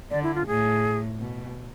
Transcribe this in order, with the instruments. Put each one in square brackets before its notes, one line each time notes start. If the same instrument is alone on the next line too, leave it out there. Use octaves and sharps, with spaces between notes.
[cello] D3 [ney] D5
[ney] E4
F4
[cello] A2 [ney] G#4
[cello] B2